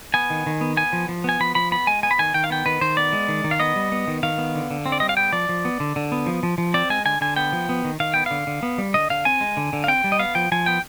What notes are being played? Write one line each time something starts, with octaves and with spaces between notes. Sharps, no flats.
B3 G#5
D#3
D#3
B3
B3 G#5
F3
F3
B3 G#5
F3 B5
F3 B5
B3 B5
G#3 G#5
B3 G#5
B5
D#3 G#5
D#3 G5
F5
B3 G5
D#3 B4
D#3 C5
B3 D5
G#3
D#3
D#3
F5
B3 D#5
G3
B3
D#3
D#3 F5
B3
D3
D3
C4
D5
G3 D#5
F5
B3 G5
F3 D5
F3
B3
D3
D3
B3
F3
F3
F3
C4 D5
G#3 G#5
D3 G#5
D3 G#5
B3 G5
F3
B3
D#3
D#3 F5
B3 G5
D3 F5
D3
B3
G3
D3 D#5
D3 F5
C4 G#5
G#3
D3
D3
F5
C4 G5
G3
D#5
B3 F5
F3 G5
F3 G#5
B3 G5